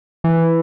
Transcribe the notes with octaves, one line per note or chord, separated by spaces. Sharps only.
E3